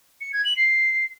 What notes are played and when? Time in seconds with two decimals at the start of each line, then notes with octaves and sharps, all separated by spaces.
0.21 C#7
0.33 G#6
0.45 F#7
0.57 C7